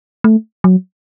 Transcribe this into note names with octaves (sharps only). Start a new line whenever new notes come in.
A3
F#3